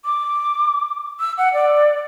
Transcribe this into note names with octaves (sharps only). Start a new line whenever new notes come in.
D6
E6
F#5
D5